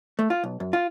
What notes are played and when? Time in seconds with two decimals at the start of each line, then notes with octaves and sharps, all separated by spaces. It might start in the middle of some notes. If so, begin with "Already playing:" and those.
0.19 A3
0.30 F4
0.44 B1
0.60 F#2
0.73 F4